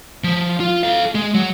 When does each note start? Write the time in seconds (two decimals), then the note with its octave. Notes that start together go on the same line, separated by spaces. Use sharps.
0.24 F3
0.60 F4
0.83 A4 F5
1.15 G#3
1.34 F#3